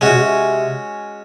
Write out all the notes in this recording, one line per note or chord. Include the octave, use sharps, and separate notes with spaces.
C3 G#3 C#4 F#4
B2
C3